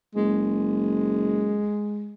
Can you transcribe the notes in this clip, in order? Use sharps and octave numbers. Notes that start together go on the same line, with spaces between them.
F#1 G#3